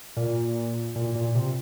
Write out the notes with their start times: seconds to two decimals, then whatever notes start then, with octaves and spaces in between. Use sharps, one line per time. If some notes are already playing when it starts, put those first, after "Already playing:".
0.16 A#2
0.95 A#2
1.15 A#2
1.35 C3